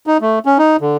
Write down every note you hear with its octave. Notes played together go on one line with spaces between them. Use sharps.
D#4
A3
C#4
D#4
D3